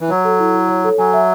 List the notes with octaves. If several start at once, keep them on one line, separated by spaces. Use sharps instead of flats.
E3
F#3 C#5
A4
E4
E4
C#5
A4
F#3 G#5
E5